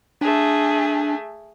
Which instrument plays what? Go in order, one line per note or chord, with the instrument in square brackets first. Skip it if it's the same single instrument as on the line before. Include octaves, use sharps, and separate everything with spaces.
[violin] A3 G#4 [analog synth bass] D4